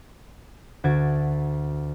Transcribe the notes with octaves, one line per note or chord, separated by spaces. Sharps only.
D2 F#4 G#6 A6 D7